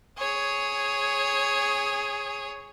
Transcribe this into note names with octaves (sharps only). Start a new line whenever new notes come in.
G#4 C#5